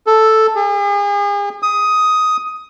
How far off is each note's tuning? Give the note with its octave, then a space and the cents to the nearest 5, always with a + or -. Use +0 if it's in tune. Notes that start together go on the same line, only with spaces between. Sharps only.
A4 +0
G#4 -40
D#6 +10